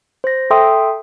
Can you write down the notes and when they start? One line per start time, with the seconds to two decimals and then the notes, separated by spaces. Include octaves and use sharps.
0.24 C5 A#6
0.50 A4 E5 G5 C6 D#6